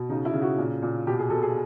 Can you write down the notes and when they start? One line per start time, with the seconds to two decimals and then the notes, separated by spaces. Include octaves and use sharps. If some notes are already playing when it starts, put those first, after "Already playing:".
Already playing: B2
0.09 C#3 D#4
0.25 E4
0.33 C#3
0.42 F#4
0.58 A#2
0.82 A#2
1.07 B2 G4
1.19 G#4
1.30 B2 A4
1.43 G#4